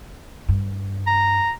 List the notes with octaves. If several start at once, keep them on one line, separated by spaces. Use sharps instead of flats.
G2
A#5